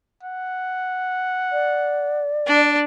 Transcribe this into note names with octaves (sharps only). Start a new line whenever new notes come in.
F#5
D5
D4